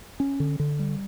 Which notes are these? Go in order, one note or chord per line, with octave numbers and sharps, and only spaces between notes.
C#4
D3
D3
G3